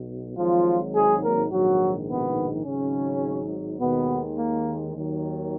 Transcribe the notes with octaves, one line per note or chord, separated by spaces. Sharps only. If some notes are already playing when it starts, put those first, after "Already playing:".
Already playing: B1 B2
G#1 G#2 F3 F#3 F4
G#3 G#4
A#3 A#4
A#1 G#2 D#3 F#3 F#4
B2 B3
G#1 G#2 C#3 F#3 C#4
D#2 B2 D#3 G#3 B3
A#3
D#2 D#3 F#3